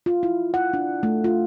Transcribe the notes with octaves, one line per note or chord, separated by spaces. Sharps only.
F4
E4
F#5
D4
A3
F4